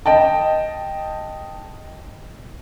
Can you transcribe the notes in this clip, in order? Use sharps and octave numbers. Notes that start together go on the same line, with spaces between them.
D#5 G5 A5